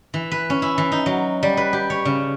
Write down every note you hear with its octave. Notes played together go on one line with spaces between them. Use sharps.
E3
B4
C#4
E4
E3
D#4
F#3
G3
B4
G4
C#5
C#3